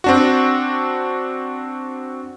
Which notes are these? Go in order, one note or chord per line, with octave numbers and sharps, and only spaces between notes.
C4 D4 F#4